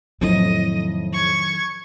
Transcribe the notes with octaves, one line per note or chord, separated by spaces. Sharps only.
F2 A2 D#3 F#3 D#5
C#6 G#6